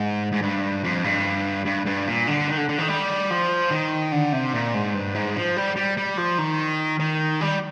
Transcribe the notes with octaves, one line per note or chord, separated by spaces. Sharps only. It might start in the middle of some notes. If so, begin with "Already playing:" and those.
Already playing: G#2
G#2
G2
F2
G2
G2
G2
A#2
D3
D#3
D3
D3
D#3
G3
F3
D#3
D3
C3
A#2
G#2
G2
G#2
F3
G3
G3
G3
F3
D#3
D#3
G3